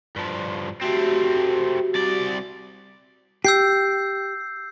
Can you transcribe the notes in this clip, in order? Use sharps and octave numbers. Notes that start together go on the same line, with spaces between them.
G2 F3
A3 C4 F#4 G4
C2 D5
G4 E6 G6 C7